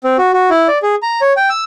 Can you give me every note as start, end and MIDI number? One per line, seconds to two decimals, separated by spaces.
0.04 0.17 60
0.18 0.32 66
0.33 0.50 66
0.50 0.67 64
0.68 0.78 74
0.83 0.95 68
1.03 1.21 82
1.21 1.33 73
1.37 1.49 79
1.49 1.64 88